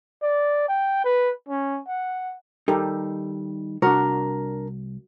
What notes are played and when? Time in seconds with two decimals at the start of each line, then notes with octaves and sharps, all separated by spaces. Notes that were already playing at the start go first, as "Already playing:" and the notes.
0.22 D5
0.68 G5
1.04 B4
1.48 C#4
1.88 F#5
2.68 D#3 G3 D#4 G4 A4 A#4
3.82 C2 D4 F#4 A#4 C#6